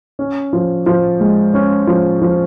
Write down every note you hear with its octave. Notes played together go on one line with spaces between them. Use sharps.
C#4
F3
F3
G#3
C#4
F3
F3